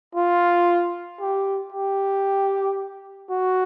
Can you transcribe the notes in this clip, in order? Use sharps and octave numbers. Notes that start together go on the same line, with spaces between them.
F4
G4
G4
F#4